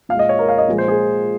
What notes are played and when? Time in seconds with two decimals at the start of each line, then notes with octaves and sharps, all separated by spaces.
0.09 A#2 F5
0.14 G#3
0.19 D#5
0.29 C#5
0.39 A#4
0.49 F5
0.58 D#5
0.68 A#2 F3 G#3
0.78 C5
0.88 G#4